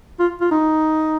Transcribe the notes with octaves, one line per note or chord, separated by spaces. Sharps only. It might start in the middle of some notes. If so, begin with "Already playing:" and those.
F4
F4
D#4